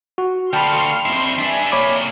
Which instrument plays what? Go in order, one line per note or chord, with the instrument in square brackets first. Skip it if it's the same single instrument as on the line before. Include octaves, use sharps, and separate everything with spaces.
[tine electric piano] F#4
[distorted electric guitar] D2 F4 [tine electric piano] G5 A5 B5 [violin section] C6 F6 C#7
[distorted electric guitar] F2 E4 [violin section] C4 C6
[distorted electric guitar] G3 D4 [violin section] E5 G#5
[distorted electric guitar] C3 A#3 [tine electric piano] C#5 B5 D6